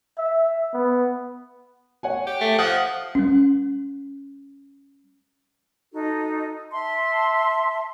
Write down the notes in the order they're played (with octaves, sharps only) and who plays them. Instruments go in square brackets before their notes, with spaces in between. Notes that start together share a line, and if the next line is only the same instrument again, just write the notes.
[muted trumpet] E5
B3
[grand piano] C#5 F#5 G#5
[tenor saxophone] G4
[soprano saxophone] A3
[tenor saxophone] F3 [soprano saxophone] F#5 [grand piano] D#6
[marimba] G3 C#4
[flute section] D#4 F#4 A4
E5 A5 C6